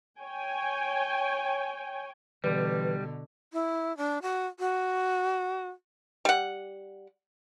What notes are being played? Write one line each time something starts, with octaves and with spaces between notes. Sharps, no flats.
C#5 G5 G#5
B2 D3 E3 G3 B4
E4
D4
F#4
F#4
G3 F#5